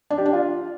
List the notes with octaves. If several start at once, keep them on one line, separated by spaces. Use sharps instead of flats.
D4
G4
D4
F4